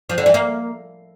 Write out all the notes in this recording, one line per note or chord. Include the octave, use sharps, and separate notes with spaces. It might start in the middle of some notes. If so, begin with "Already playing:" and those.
F3
D3
E3
A#3